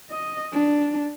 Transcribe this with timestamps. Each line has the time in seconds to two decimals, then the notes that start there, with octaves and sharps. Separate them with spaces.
0.11 D#5
0.53 D4